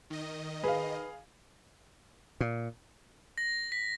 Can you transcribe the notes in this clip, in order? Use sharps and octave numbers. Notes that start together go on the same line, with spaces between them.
D#3 D#5
G#4 B4 F5
A#2
A#6
B6